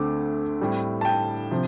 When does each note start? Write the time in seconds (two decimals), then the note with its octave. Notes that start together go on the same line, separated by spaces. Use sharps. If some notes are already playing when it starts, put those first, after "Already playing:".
Already playing: D2 D3 A3 C4 D6
0.60 A2 G3 C4
1.01 A5
1.05 G5
1.51 C3 F3